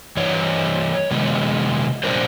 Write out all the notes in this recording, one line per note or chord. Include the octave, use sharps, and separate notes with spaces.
G2 E3 C#5
C3 D#3 G#3 B3
A#2 G3 A#3 D4 A#4 C5